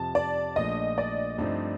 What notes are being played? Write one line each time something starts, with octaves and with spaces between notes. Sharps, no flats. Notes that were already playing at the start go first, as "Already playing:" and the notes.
Already playing: F2 C3 F3 A5
D5
A#1 A#2 F3 A3 D4 D#5
D5
G2 F3 A3 C4 D#4